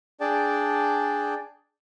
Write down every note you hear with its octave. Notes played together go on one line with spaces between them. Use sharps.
D4 G#4 D5 G5 A5